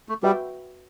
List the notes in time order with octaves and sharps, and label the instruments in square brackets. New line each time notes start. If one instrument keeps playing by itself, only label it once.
[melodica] A3
[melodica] G3 [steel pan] F#4 B4 E5 G5